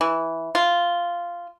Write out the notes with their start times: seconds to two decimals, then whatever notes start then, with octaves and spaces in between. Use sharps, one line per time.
0.01 E3
0.55 F4